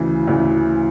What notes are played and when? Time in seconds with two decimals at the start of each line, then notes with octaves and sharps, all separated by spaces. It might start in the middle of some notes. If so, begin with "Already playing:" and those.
Already playing: D2 C#3 E3
0.28 D2 C#3 E3